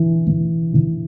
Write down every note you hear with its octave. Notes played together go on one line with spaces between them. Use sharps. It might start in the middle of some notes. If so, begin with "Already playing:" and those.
Already playing: E3
E3
E3